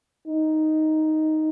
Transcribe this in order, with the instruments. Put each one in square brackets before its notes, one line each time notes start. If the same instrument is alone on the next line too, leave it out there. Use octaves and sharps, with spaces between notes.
[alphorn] D#4